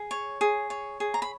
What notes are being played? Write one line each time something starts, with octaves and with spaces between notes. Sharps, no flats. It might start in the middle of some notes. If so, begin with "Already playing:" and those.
Already playing: G#4
C#5
G#4
C#5
G#4
A#5
B5